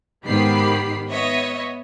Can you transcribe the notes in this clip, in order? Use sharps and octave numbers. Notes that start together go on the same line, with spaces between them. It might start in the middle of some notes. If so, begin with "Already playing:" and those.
G#2 D#3 B3 G4 B5 C7
B3 C#5 D#5 E5